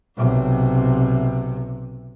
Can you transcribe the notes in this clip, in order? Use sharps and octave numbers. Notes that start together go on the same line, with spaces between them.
B1 C3